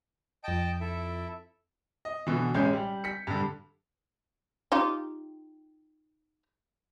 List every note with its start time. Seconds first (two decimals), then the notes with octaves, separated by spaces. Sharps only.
0.44 F2 D#5 G5 A5 D7
0.81 E4 A4 E5
2.05 D#5
2.27 B2 D3 E3
2.54 A1 G#3 C#4 E5 G#5 G6
2.73 G3
3.04 B6 C#7
3.27 G2 D3
4.72 D#4 F4 G4